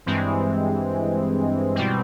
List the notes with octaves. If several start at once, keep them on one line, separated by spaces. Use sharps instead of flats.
G2 E3 G#3 C4
B2 G3 C4